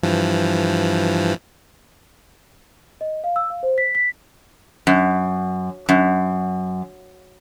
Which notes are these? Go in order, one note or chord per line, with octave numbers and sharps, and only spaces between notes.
G2 E3 F3
D#5
F5
E6
F5
C5
B6
B6
F#2
F#2